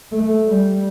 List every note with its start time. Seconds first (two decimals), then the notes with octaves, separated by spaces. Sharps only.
0.12 A3
0.47 G3